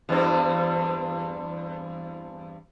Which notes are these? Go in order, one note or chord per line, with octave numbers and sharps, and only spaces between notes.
E2 G2 C4